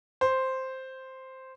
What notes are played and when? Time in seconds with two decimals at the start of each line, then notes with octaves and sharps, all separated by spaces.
0.21 C5